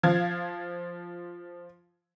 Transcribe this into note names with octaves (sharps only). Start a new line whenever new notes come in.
F3 F5 G#6